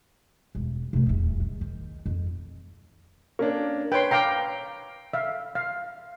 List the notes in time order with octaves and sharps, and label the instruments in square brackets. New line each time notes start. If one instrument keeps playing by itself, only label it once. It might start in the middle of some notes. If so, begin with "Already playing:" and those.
[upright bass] E1
C3 A3
D#1 E2
G#3
D#3
F2
[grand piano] A#3 C#4 D4
[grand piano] B4 C#5 [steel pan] G5 C6
[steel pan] F5 G5 A#5 [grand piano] D6 C7
[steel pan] E5 F5
F5